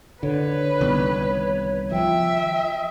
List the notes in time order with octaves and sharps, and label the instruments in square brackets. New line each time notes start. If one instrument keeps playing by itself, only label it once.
[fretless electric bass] D3 [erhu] B4 [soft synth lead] C#5
[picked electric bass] C2 D#3 B3
[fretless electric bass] F3 [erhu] E5 [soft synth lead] G5